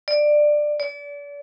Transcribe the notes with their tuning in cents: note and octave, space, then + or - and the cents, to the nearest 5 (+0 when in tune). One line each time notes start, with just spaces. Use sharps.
D5 +15
D5 -35